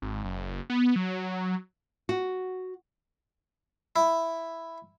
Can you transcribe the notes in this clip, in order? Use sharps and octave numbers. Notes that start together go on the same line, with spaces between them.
G#1
F#1
B3
F#3
F#4
E4